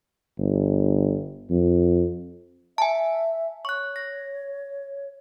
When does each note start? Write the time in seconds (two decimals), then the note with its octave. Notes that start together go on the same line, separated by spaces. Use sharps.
0.38 G1
1.50 F2
2.78 E5 G#5 A5
3.65 C#5 C#6 F#6
3.96 A#6